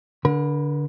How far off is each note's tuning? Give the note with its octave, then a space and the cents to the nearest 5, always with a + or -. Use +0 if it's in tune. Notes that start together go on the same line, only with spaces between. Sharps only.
D3 -10 A#4 +45 B5 +5